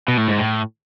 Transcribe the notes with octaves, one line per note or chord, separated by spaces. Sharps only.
B2
A2
G#2
A2